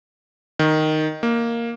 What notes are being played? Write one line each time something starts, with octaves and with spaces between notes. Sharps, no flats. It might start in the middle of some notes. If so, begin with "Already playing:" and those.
D#3
A#3